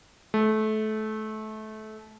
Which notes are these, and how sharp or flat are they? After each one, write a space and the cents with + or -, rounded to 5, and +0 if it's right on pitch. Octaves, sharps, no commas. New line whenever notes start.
A3 -25